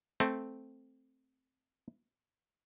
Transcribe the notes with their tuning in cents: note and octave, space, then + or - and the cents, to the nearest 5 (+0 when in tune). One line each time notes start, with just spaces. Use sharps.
A3 +0 C4 +0